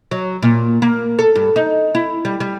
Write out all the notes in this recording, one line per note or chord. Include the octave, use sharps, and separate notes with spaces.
F#3
A#2
A#3
A4
G2
D#4
E4
G3
G3